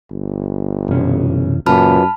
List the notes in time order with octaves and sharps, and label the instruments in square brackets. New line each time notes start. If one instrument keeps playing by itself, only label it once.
[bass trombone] G1
[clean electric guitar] B1 C#4 [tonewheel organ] F#2 C3 E3
[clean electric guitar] C#2 A#2 [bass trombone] F#2 [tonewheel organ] F4 B4 [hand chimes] A5 B5 F6